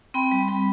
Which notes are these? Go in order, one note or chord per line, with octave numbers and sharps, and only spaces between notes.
C4 G5 B5
G3
G3 G5 B5